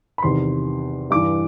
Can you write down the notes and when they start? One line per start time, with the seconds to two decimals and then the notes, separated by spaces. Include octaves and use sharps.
0.18 B5
0.23 E2 C3 D#3 C6
1.11 G2 E3 D6